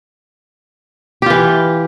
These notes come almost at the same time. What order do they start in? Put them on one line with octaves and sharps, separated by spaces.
G4 F4 E3